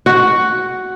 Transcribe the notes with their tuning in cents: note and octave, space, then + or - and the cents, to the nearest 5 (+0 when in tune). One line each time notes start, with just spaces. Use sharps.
F#4 +5